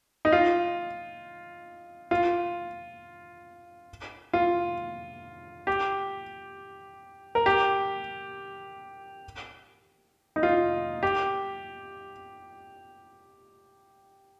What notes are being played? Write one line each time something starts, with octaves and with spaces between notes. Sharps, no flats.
D#4
F4
F4
F4
G4
A#4
G4
D#4
F4
G4